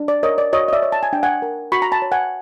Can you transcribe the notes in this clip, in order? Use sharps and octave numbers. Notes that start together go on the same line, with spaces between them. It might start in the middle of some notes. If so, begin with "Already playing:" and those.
Already playing: D4
D5
A#4 C#5 D#5
D5
F#4 C#5 D#5
D#5
D5 E5
C#5
A5
G#5
D4 G5
F#5 G#5
A#4
F#4 B5 C#6
A#5
A5 B5
C#5
F#5 G#5